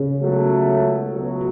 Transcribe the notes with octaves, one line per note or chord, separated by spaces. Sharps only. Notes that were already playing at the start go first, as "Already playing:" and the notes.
Already playing: C#3
C#2 B2 F#3 A3
C#2 B2 F#3